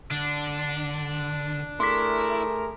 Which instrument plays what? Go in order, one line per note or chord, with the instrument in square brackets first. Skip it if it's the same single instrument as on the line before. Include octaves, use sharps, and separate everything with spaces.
[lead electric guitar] D3 [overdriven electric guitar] D4
[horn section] A3 G#4 A#4 [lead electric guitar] E4 [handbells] C6 D6 B6